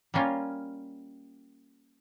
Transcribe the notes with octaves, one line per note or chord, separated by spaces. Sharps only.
G3 A#3 C#4 F4